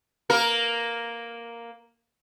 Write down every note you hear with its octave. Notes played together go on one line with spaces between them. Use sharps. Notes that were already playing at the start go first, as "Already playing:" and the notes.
A#3 A#4